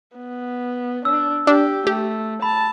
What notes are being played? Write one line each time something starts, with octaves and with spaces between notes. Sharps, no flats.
B3
D4 E6
D4 G4
A3 G4
A5 B5